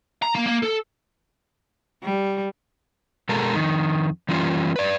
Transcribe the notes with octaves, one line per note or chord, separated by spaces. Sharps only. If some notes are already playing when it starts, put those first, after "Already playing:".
A#5
A#3
A#3
A4
G3
B2 G#3 A4 A#4
F2 G#2 D#3
E3 G3 C#4 F4
B4 D5